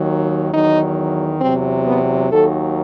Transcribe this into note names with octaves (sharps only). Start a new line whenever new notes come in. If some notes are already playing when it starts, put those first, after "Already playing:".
Already playing: D#2 D#3 F#3
E2 D#3 F#3 D#4
E2 C3 F#3 C4
B3
D#2 D#3 F#3 A4